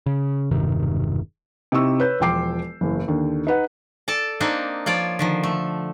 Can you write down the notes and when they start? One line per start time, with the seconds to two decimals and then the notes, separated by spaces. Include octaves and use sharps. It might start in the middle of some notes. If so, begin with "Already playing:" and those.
0.06 C#3
0.51 E1 G2 C3 D#3
1.72 C3 D#4 E4 C#6 E6
2.00 B4 C#5 G6
2.20 E1 F3 F4 G5 D6 C7
2.81 F#1 E2
3.08 D#2 D3
3.47 D#4 B4 F#5
4.08 A4 D5 A5
4.40 A#3 C4 D4 D#4
4.86 F3 F4 C#5 D5
5.19 D3 D#3 F3
5.43 A3